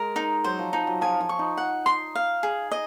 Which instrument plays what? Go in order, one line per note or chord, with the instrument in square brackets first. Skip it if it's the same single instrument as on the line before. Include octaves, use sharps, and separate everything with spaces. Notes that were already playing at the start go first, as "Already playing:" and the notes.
Already playing: [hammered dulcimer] G#3 [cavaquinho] A#4
[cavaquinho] D#4
[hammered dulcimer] F#3 [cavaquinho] C5
[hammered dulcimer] F3
[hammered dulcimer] F3 [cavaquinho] D#4
[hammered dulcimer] F#3
[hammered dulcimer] F3 [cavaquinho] G#5
[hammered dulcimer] F3
[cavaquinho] C#6
[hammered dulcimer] D#4
[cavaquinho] F#5
C6
F5
G#4
D#5